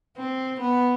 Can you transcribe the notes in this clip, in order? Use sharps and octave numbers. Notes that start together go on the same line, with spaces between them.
C4
B3